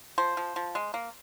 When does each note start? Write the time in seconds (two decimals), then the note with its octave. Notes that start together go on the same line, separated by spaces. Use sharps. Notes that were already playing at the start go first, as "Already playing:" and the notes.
0.18 F3 C5
0.37 F3
0.56 F3
0.75 G#3
0.94 A#3